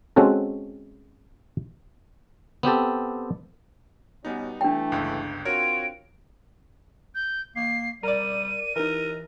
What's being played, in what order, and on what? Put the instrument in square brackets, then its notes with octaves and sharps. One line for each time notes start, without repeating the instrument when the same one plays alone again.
[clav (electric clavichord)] G#3 C4 C#4 F#4 A4
B3 C4 G4 A4
[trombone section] B2 C#4 [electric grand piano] G3 B3 D#4
[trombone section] E3 A3 [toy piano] D4 G5
[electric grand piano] G1 C#2
[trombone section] C4 F4 [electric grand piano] F#4 A#4 C#5 [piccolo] D7
[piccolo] G6
[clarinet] A#3 [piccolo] C7
[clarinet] G3 [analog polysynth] A#4 D5 [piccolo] D#7
[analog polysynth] E3 D#4 [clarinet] A#4